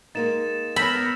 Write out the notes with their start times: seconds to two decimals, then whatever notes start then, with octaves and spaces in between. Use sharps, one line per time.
0.15 G#3 A#3 D#4 A6 E7
0.76 B3 A#4 B5 E6 G6 E7